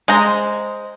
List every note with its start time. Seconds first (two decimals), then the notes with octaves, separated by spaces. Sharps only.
0.08 G#3 C5 A#5